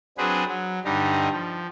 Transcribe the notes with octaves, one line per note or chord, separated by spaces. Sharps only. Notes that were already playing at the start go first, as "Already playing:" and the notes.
F#3 C4 D4 G#4 B4 C5
F#3
G2 D3 G3 D#4
F3